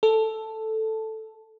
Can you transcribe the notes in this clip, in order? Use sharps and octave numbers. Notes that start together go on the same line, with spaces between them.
A4